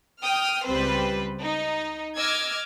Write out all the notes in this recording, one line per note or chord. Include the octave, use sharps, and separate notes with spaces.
G5 D#6 F6
C#2 G3 C4 B4 C5
D#4
D#5 D6 E6 F6 G#6